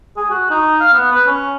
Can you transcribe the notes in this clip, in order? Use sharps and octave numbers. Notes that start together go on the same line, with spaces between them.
G#4
F#4
D#4
F5
B3
B4
C#4